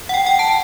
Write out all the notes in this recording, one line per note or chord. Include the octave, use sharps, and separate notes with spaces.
F#5
G5
G5
A5